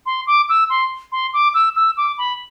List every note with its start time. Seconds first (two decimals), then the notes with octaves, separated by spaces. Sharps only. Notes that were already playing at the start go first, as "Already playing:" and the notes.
0.06 C6
0.27 D6
0.49 E6
0.70 C6
1.12 C6
1.34 D6
1.54 E6
1.76 E6
1.97 D6
2.18 B5